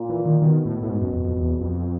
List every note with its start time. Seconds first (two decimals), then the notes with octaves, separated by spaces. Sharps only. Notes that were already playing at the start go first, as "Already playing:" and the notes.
Already playing: A#2
0.10 E3
0.26 D#3
0.41 B2 D#3
0.65 A2
0.83 A2
0.90 G#2
1.02 F#2
1.13 F2
1.25 F2
1.37 E2
1.61 F2